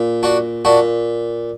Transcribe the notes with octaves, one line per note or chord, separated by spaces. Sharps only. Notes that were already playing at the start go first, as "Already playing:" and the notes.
Already playing: A#2
D4 F#4
A#2 D4 F#4